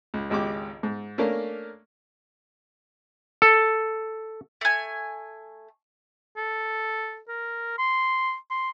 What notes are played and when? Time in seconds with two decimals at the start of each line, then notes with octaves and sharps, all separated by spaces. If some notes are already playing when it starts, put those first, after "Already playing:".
0.14 C#2
0.30 G#1 C#2 G4 D6
0.83 G#2
1.18 A3 A#3 C#4 D4 A#4
3.42 A4
4.61 A3 G#5
6.37 A4
7.28 A#4
7.78 C6
8.50 C6